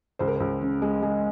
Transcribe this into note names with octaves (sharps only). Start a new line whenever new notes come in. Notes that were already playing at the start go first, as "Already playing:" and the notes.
C#2 C5
A#4
C#2 C5
C#3
G#3
G#3